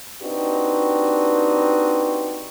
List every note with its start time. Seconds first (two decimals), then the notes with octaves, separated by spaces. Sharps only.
0.22 C4 D4 D#4 F#4 G4 B4